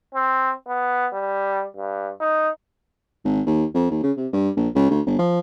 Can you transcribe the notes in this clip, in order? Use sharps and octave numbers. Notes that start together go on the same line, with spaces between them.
C4
B3
G3
G2
D#4
G#1
D#2
F2
D#2
C#3
C3
G2
A#1
C#2
D2
G1
F3